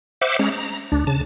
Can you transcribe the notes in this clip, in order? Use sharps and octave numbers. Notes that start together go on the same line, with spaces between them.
C5 E5 F#5 D6
G#3 C#4 A#5
A#5
D2 D4
C#3 A5